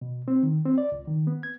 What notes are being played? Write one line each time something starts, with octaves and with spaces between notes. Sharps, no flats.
B2
C4
D#3
C4
D5
C#2
D#3
B3
G#6